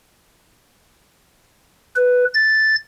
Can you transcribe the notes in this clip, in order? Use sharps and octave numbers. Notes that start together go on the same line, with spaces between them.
B4
A6